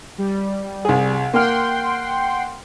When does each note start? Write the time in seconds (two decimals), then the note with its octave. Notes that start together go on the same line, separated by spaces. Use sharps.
0.18 G3
0.85 C2 G#4
1.33 A#3 F#5 G5 C6 F6